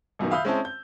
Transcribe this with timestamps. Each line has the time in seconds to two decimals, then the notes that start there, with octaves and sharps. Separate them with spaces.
0.19 A#1 F#2 B2 D#3
0.31 E5 F5 B5 D#6 E6 G6
0.45 G#3 C4 C#4 E4 C5 A5
0.65 G6